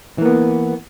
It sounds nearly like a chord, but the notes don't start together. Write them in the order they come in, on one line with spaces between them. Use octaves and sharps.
E3 A#3 B3